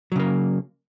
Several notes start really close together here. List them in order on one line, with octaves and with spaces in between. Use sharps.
F#3 C#3 A#3